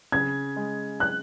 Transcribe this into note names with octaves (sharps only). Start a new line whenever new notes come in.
C#3 G#6
G#3
F#6